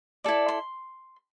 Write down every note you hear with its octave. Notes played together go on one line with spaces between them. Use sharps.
E4 A4 D5
C6